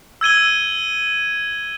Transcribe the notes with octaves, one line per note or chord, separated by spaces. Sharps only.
E6 G#6 D#7 G7